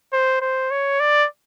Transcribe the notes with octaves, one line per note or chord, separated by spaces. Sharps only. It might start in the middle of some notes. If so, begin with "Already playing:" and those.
C5
C5
C#5
D5